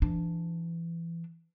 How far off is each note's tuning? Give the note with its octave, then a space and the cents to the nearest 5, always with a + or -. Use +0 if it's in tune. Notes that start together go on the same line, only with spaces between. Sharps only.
E3 +25 D4 +0